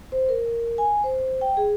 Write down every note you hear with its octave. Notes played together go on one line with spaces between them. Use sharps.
C5
A#4
G#5
C5
G5
G#4